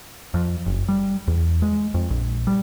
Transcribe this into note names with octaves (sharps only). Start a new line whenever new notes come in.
F2
F#1
G3
E2
G#3
F2
A#1
G3